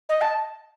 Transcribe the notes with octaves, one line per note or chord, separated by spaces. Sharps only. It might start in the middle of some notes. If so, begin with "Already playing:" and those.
D#5
A5